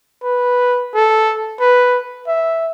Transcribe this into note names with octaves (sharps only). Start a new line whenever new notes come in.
B4
A4
B4
E5